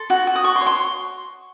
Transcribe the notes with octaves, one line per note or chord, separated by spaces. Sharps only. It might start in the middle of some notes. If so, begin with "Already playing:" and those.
Already playing: A4 C6
F#4
F#4
D#6
F#4 C#6
C6
C#5
C6